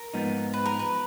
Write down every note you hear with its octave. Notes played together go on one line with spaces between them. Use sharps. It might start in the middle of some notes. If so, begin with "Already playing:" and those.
Already playing: A#4
G#2 F3 B3 D#4
B4
A#4
B4